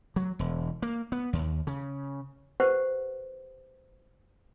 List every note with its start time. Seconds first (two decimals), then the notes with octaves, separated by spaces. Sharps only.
0.16 F#3
0.39 E1
0.82 A#3
1.12 B3
1.33 D#2
1.67 C#3
2.60 G4 B4 C5 F#5